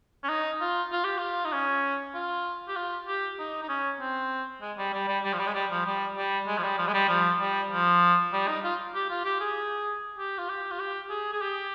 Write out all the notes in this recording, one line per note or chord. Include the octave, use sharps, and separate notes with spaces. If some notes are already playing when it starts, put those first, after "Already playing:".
C#4
D#4
F4
F4
G4
F4
D#4
C#4
F4
G4
F4
G4
D#4
D#4
C#4
C4
G#3
G3
G3
G3
G3
F3
G3
G#3
G3
F3
G3
G3
G#3
F3
G3
F3
G#3
G3
F3
G3
F3
G3
D#4
F4
G4
F4
G4
G#4
G4
F4
G4
F4
G4
G#4
G#4
G4